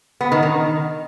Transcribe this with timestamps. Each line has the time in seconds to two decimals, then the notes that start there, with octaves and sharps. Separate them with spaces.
0.21 B3
0.32 D#3
0.43 D#3